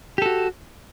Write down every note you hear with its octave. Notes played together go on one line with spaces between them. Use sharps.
F#4 G4 A4